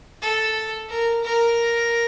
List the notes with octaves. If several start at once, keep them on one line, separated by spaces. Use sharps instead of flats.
A4
A#4
A#4